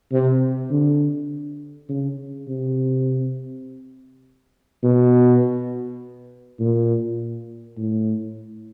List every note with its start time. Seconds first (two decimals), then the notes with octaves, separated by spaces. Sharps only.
0.13 C3
0.71 D3
1.89 C#3
2.48 C3
4.83 B2
6.59 A#2
7.77 A2